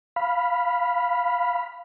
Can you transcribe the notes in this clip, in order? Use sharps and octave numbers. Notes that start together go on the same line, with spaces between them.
F5 B5